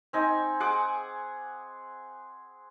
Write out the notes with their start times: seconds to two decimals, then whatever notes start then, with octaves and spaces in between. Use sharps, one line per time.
0.13 C4 D#4 G#5
0.60 G#4 F#5 C6 D6